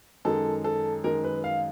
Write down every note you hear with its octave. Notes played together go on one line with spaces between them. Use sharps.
F#2 D#3 G#3 A4
A4
F#2 D#3 G#3 A#4
B4
F5